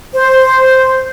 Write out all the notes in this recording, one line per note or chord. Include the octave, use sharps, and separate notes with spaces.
C5